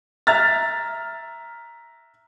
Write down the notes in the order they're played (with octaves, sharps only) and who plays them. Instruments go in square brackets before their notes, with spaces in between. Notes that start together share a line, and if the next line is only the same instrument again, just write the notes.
[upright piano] E5 A#5 F6 A6